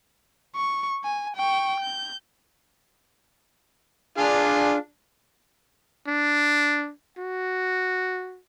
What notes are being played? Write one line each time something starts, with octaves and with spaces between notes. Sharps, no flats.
C#6
G#5
G5 C#6
G6
D4 F4 G#4 F5
D4
F#4